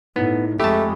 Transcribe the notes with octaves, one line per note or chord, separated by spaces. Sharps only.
A2 B3 D#4 E4
F2 G#3 A3 G4 A5 B5 C#6